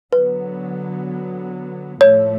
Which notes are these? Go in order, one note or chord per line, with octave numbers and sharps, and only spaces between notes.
D3 F#3 B3 B4
A2 F3 A3 C#5